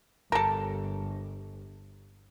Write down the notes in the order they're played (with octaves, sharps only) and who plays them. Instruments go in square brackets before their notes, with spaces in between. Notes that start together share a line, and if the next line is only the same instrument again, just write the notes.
[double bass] G1 [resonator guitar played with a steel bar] G4 A5 [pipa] A4 A#4